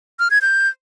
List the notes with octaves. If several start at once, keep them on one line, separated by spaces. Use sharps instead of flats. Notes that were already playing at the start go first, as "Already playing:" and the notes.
F6
G#6
G6